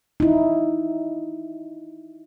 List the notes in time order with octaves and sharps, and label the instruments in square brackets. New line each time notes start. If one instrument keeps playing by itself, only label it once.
[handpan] D#4 E4